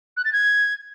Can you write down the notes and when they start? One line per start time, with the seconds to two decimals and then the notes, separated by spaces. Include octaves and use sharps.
0.17 F#6
0.25 A6
0.33 G#6